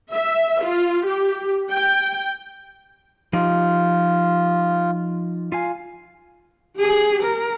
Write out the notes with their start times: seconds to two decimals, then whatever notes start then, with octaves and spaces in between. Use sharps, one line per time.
0.12 E5
0.62 F4
1.05 G4
1.70 G5
3.33 F3 D#4 F4 G4
5.52 F4 F5 G#5
6.77 G4 G#4
7.23 A#4